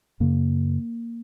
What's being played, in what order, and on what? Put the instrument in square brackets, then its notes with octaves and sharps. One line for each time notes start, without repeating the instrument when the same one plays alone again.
[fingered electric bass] F#2 C#3 A#3